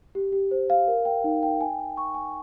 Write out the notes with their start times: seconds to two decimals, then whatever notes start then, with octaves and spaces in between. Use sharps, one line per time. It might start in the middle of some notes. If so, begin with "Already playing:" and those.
0.15 G4
0.32 G4
0.51 C5
0.70 F5
0.88 A#4
1.05 G5
1.24 D#4
1.43 G5
1.61 G#5
1.79 G#5
1.97 C#6
2.14 G#5